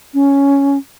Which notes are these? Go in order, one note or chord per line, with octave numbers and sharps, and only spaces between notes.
C#4